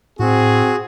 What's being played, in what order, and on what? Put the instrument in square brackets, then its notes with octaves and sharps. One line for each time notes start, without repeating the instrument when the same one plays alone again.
[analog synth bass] A2 [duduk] C4 [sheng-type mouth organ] F#4 [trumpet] G#4